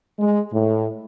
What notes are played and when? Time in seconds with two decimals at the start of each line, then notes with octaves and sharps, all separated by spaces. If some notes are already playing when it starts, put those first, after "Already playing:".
0.18 G#3
0.52 A2